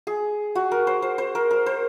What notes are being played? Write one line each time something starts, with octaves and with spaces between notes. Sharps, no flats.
G#4
F#4
A#4
C5
C5
C5
A#4
A#4
C5